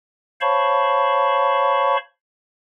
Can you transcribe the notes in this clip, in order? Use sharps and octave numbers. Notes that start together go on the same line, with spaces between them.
C5 C#5 F5 A5 B5 C#6